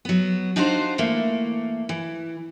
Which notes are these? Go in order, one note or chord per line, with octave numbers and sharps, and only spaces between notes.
F#3 B3
D4 D#4 F4 F#4 B4 C5
E3 A3 A#3
E3